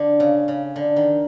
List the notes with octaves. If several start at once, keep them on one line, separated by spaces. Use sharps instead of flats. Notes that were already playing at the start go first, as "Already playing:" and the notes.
Already playing: D3
C#3
C#3
D3
D#3